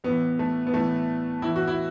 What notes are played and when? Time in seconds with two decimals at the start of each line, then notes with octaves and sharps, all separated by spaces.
0.04 A2 E3 B3
0.39 A3
0.67 B3
0.73 A2 E3 A3
1.42 A2 E3 E4
1.56 F#4
1.67 E4